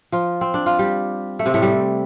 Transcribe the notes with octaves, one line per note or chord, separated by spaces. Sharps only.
F3 F4
C4
D4
F4
G3 G4
A3
C3 C4
A2 A3
G3